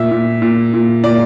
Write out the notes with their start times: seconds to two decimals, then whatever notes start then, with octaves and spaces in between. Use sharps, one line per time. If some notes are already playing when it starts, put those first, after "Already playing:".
Already playing: A#2 E5
0.11 A#2
0.42 A#2
0.74 A#2
1.04 A#2 D5